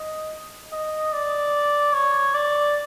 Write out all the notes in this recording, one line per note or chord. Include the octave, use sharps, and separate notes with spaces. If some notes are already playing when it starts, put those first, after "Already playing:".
Already playing: D#5
D#5
D5
C#5
D5